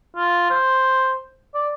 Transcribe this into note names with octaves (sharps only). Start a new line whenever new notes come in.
F4
C5
D5